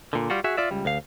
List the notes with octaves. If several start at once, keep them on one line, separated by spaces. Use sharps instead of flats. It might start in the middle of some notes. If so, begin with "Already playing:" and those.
A#2 D3
G3 F4 F#4
F#4 G#4 E5
F4 D5 E5
C#2 G3
D2 F5